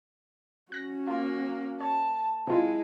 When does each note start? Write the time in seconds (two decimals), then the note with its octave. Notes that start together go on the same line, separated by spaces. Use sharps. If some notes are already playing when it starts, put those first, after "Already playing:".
0.72 C#4 F#4 F#6 A#6
1.07 A#3 F4
1.80 C#5 A5
2.47 C3 G#3 E4 F4